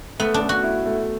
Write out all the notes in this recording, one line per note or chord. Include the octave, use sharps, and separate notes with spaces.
A3 B3
D4
A3
F#4
E4
A3